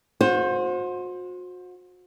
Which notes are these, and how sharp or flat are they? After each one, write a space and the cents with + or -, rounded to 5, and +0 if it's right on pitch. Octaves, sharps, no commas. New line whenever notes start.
F#4 -35 C5 +10